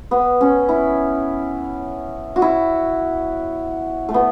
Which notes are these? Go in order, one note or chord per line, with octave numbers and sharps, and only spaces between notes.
B3
C#4
E4
F#4
E4
A3
B3